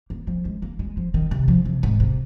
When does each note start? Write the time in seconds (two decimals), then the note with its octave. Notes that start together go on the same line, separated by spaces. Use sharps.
0.10 A#3
0.27 F3
0.45 G#3
0.62 A#3
0.79 G#3
0.97 F3
1.14 D#3
1.31 C3
1.48 F3
1.65 C3
1.83 G#2
2.00 C3